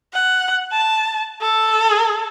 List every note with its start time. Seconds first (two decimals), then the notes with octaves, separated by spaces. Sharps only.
0.14 F#5
0.72 A5
1.42 A4